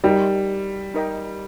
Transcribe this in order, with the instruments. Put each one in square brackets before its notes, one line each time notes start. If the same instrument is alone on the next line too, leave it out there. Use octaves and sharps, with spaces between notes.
[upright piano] G3 [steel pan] D#4 A#4 D#5 G5
[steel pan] D#4 A#4 D#5 G5